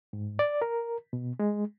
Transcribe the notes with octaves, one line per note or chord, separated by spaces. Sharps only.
G#2
D5
A#4
B2
G#3